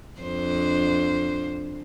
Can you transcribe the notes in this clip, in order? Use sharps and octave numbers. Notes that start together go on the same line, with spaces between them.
F2 D4 C5